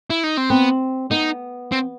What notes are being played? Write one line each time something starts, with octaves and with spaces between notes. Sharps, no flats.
E4
D#4
C4
B3 C4
B3 D#4
C4